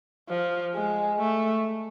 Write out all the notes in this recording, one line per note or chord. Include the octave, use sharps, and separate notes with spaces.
F3
G#3
A3